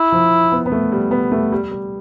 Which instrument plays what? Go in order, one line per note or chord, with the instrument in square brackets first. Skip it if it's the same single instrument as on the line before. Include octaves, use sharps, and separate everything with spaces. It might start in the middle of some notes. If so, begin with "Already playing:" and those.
Already playing: [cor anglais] E4
[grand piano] F3
B3
B3
A3
G3
B3
A3
G3
G3